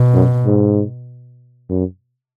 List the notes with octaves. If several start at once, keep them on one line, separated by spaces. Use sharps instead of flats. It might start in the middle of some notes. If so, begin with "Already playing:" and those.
Already playing: B2
F#2
G#2
F#2